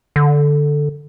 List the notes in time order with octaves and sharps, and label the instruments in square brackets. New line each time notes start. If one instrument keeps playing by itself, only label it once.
[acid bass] D3